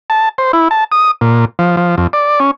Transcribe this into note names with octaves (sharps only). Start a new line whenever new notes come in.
A5
C5
E4
A5
D#6
A#2
F3
F3
F2
D5
C#4